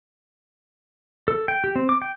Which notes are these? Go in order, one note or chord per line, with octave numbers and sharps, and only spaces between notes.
A4
G5
G4
C4
D6
G5